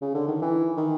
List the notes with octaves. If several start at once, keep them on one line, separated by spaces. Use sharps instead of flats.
C#3
D3
D#3
E3
D#3